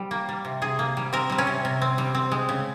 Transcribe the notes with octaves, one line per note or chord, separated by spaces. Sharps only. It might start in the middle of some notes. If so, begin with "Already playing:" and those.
Already playing: G3 C4
A#3
G3
C3
C3 G#4
A#3
G3
C4 A#4
G3 C4
C#4
C3
C3
C4
G3
C4
G#3
C#3